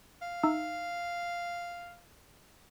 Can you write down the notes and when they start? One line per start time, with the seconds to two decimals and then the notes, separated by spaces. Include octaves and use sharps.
0.22 F5
0.43 D#4 E5 E6